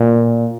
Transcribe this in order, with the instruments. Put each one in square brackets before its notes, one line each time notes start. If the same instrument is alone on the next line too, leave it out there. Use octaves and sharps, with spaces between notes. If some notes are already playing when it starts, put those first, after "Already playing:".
Already playing: [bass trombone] A#2